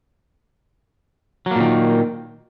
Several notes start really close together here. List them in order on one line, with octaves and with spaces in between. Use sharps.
F#3 A#3 A#2 D#3